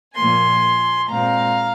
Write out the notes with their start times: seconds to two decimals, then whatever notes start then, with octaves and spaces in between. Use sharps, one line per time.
0.15 A#2 F3 A#3 G#5 C6
1.08 A#2 G#3 C4 F5 A#5